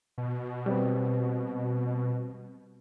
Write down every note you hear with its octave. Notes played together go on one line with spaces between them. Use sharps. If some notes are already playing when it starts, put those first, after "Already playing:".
B2
G3 C4 B4